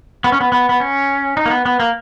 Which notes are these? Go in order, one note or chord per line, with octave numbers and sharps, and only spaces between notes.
B3
C#4
B3
B3
B3
C#4
D#4
A#3
B3
B3
A#3